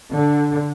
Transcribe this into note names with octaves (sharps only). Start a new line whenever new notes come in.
D3